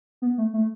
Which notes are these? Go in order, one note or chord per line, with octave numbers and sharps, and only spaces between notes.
B3
A3
A3